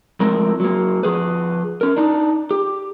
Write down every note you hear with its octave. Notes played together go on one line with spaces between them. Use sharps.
F3 G#3 A3 C4 E4 A#4
F#3 A#3
F3 G#4 B4
C#4 A#4
D4 D#4
G4